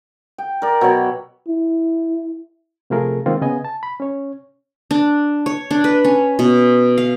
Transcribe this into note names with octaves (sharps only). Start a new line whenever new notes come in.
G5
A#4 D5
B2 F#3 C#5 B5
E4
C3 F3 A3 F4 G#4 A#4
D#3 G#3 A#3 C4 F4
C#3 B3 D#5 G#5
A5
B5
C#4 C#5
D4
C#5
D4
B4
C#4
B2
F5